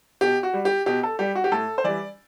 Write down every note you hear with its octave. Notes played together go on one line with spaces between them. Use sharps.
B2 G4
F#4
G3
G4
B2 G4
A4
G3 G4
F#4
G4
A2 A4
C5
E3 G3 D5